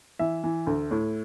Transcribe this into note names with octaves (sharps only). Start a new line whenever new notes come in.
E3 E5
E3
D2
A2